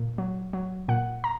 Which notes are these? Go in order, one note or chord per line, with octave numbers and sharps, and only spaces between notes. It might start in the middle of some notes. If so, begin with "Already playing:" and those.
Already playing: A#2
F#3
F#3
A#2 F#5
A#5